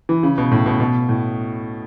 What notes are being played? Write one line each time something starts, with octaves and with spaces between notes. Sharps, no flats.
E3
C#3
B2
A2
B2
B2
A2